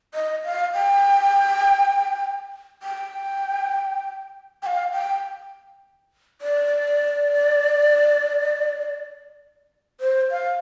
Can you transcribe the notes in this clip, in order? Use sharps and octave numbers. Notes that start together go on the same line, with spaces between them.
D#5
F5
G5
G5
G5
F5
G5
D5
C5
F5